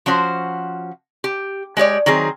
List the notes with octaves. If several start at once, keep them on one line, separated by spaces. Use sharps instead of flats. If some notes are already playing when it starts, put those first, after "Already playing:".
F3 C#4 F#4 C5
G4
G#3 G4 C#5 D5
D#3 F#3 C4 G#4